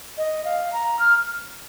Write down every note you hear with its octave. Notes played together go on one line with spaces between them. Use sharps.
D#5
F5
A#5
F6